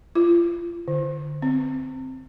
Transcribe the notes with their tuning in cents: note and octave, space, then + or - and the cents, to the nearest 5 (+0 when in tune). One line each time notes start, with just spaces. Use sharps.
F4 -35
D3 +10
C4 -5